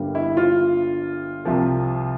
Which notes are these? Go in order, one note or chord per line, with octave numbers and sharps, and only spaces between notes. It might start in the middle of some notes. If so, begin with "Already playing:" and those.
Already playing: G1 G2 D3 G3 A#3
E4
F4
C2 C3 F3